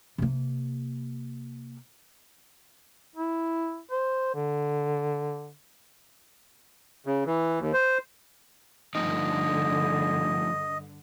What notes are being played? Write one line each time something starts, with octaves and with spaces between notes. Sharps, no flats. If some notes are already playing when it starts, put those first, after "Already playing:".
C3 A#3
E4
C5
D3
C#3
E3
D#2
C5
G2 D3 F3 A3 D#4 D#5